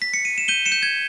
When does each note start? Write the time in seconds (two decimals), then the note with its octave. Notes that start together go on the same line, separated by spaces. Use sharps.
0.02 B6
0.14 C#7
0.25 D#7
0.38 E7
0.48 G6 D#7 G7
0.66 C#7 E7
0.72 G6
0.83 G#6